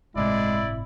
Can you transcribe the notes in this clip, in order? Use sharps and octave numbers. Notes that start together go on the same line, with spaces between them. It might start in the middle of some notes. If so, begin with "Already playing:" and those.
G1 A2 C3 G#3 E4 D5